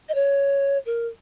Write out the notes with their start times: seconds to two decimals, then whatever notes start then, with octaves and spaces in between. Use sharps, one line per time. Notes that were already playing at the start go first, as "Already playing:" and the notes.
0.09 D#5
0.14 C#5
0.86 A#4